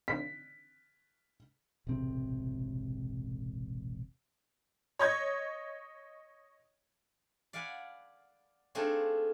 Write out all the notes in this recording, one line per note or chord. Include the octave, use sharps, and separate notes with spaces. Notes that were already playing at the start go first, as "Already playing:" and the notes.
B6
E1 A1 C3 C4
C#5 D#5 G#6
D5 F5 F#5 G#5 B5
A3 C4 D4 D#4 F4 G#4